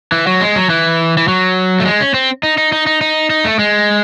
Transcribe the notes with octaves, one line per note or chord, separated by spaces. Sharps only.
E3
F#3
G#3
F#3
E3
E3
F#3
A3
G#3
C#4
C4
D#4
D#4
D#4
D#4
D#4
D#4
A3
G#3